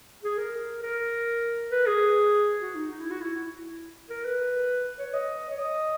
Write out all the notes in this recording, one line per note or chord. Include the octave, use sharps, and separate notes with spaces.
G#4
A#4
A#4
B4
G#4
F#4
D#4
D#4
E4
F#4
E4
A#4
B4
C#5
D#5
C#5
D#5